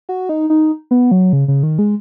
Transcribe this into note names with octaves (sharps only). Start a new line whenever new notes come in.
F#4
D#4
D#4
B3
F#3
C#3
C#3
D#3
G#3